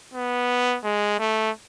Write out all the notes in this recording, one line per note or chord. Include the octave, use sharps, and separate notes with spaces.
B3
G#3
A3